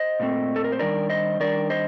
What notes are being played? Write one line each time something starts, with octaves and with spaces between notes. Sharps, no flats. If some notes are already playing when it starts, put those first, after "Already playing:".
Already playing: C5 D#5
A#2 A3 C4
A4
A#4
C5
D#3 G3 D4 A#4 D5
C5 D#5
D#3 G3 D4 A#4 D5
C5 D#5